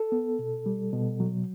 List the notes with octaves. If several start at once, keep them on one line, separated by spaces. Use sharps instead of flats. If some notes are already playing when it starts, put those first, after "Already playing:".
Already playing: A4
B3
B2
G3
B2
F#3